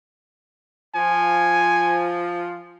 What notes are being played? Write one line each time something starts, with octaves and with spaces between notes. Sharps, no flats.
F3 F4 G#5